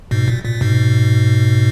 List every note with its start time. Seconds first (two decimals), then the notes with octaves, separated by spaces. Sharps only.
0.11 G#2 B2
0.28 A#2
0.44 A#2
0.61 G#2 B2